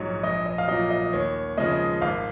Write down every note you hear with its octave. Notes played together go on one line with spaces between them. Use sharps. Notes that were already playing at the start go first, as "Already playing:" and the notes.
Already playing: A#1 G#2 F#3 C#5
A#1 D#5
D#5
F5
A#2 F#3 D#5
D#5
D#2 C#5
C#3 F3 G#3 D#5
G#1 F5